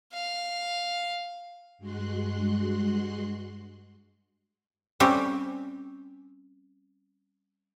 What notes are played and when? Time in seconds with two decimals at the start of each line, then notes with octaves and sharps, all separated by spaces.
0.14 F5
1.78 G2 G#3 F#4 C6 F#6
5.00 G3 C4 C#4 G4